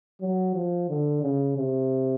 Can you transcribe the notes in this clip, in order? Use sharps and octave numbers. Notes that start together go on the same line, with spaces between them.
F#3
F3
D3
C#3
C3